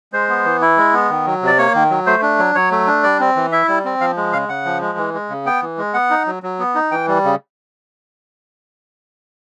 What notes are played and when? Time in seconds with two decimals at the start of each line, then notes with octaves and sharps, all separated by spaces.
0.13 G#3 C5
0.29 B3
0.45 E3
0.62 E4
0.77 G#3
0.93 B3
1.10 D#3
1.26 F#3
1.42 C3 D5
1.58 A#3 C#5
1.74 D#3
1.90 F#3
2.06 A3 C5
2.22 D4
2.39 F#3
2.55 F#3 C#5
2.71 A3
2.87 D4
3.03 G3 D5
3.20 C4
3.36 E3
3.52 E4 E5
3.68 G3
3.85 C4
4.01 F3 F5
4.17 G#3
4.33 C#3 F5
4.49 C#3 F#5
4.65 F3
4.81 G#3
4.98 E3
5.14 G#3
5.29 C#3
5.46 B3 G5
5.62 E3
5.78 G#3
5.94 B3 F#5
6.10 D#4
6.26 F#3
6.43 F#3
6.59 B3
6.75 D#4
6.92 E3 G5
7.08 G3
7.24 C#3